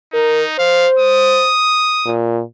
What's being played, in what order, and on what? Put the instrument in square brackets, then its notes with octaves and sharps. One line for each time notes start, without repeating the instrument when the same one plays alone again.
[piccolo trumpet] D#4 [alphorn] A#4
[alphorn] C5 [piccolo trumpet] F5
[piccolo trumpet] D#6
[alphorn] A#2